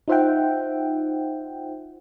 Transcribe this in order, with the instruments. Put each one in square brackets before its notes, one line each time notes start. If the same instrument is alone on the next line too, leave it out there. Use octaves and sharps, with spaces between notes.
[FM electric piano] D#4 F4 C5 E5 F#5 G5